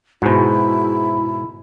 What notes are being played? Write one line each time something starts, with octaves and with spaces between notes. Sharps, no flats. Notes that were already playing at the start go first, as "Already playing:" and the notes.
G#2 B2 E4 F#4 G#4 C5